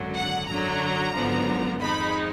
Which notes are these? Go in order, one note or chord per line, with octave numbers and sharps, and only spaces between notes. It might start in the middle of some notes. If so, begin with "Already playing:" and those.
Already playing: G#1 F#2 D3 F#3
F#5
F#2 D3 F#3 A#5
G#1 F#2 D3 F3 B3
F2 D#3 G#3 D#4 B5